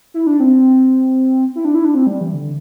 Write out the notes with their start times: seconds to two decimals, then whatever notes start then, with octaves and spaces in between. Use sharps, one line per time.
0.14 E4
0.27 D4
0.40 C4
1.56 E4
1.65 D4
1.75 E4
1.85 D4
1.94 C4
2.07 G3
2.21 E3
2.33 D3